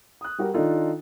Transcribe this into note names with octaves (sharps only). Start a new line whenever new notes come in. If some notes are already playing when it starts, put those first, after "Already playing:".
D#6 F#6
G3 F#4 G4 A#4
D#3 D4 D#4 F4 A4